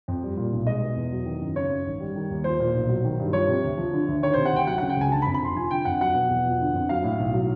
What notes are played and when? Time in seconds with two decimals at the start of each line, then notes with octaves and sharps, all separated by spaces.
0.08 F2
0.23 G3
0.37 A#2
0.53 B1
0.66 G#3 D#5
0.81 B2
0.96 E2
1.12 F#3
1.26 D#3
1.41 F#2
1.55 C#3 C#5
1.71 F#2
1.86 G#1
2.00 G3
2.16 D#3
2.30 D#2
2.44 F3 C5
2.60 A#2
2.75 B1
2.89 F#3
3.05 D#3
3.19 G2
3.33 F3 C#5
3.48 C3
3.64 D2
3.78 F3
3.93 D3
4.08 D2
4.23 D#3 C#5
4.34 C3 C5
4.45 F#5
4.53 D2 G5
4.67 F#3 F#5
4.78 C#3 F#5
4.89 G5
4.96 C#2 G#5
5.12 D3 A5
5.22 B5
5.26 F2
5.34 B5
5.42 F1 C6
5.56 F3 G#5
5.71 D3 G5
5.85 F2 F#5
6.01 F#3 F#5
6.15 B2
6.30 E2
6.45 F3
6.60 D3
6.74 F2
6.89 F#3 F5
7.04 A2
7.19 B1
7.34 F#3